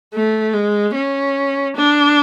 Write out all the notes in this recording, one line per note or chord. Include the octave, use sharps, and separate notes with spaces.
A3
G#3
C#4
D4